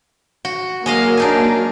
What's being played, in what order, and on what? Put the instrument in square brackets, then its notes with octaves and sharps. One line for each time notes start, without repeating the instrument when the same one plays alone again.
[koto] F#4
[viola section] F#3 A#3 [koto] G#3 D#5 F5
[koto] D4 D#4 G#4